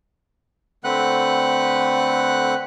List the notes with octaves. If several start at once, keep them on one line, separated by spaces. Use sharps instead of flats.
D3 A3 C4 B4 F#5 F#6